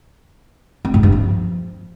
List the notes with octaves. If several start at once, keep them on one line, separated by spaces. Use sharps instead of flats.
C4
G#2
G2
F3